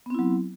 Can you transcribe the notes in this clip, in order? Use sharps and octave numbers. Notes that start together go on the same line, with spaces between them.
F#3 B3 C4 E4